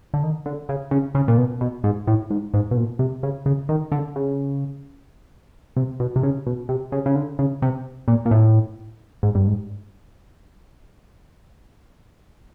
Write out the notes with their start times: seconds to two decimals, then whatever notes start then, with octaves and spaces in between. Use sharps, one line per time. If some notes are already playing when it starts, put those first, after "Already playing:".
0.14 D3
0.23 D#3
0.46 D3
0.69 C#3
0.91 C#3
1.15 C#3
1.28 A#2
1.38 B2
1.61 B2
1.84 G#2
2.07 A2
2.30 G#2
2.54 G#2
2.71 B2
2.77 A#2
2.99 C3
3.23 C#3
3.46 C#3
3.69 D#3
3.92 D3
4.16 C#3
5.77 C3
6.00 B2
6.16 C3
6.23 C#3
6.47 B2
6.69 C3
6.92 C#3
7.06 C#3
7.15 D3
7.39 C#3
7.62 C3
8.08 A#2
8.26 A#2
8.31 A2
9.23 G#2
9.35 G2
9.47 G#2